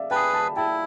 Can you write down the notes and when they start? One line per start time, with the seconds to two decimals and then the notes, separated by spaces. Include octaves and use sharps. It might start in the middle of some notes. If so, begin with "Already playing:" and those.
Already playing: D5 E5 F5
0.11 G#4 B4 G5 A5
0.33 A5 B5
0.56 E4 G5 A5